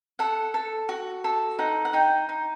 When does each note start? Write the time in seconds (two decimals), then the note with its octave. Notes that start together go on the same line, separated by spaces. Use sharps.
0.19 A4 F#5
0.54 A4
0.89 F#4
1.24 A4
1.59 D#4 F#5
1.85 F#5
1.93 D#4 G5
2.29 D#4